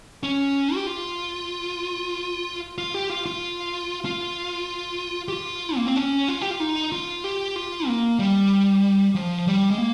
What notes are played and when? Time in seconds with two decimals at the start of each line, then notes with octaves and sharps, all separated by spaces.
0.23 C#4
0.75 G4
0.87 F4
2.78 F4
2.94 G4
3.09 F4
3.26 F4
4.05 F4
5.28 G4
5.32 F4
5.76 A#3
5.86 C4
5.96 C#4
6.28 F4
6.41 G4
6.51 F4
6.60 D#4
6.92 F4
7.24 G4
7.56 F4
7.88 A#3
8.19 G3
9.15 F3
9.47 G3
9.71 G#3
9.78 A#3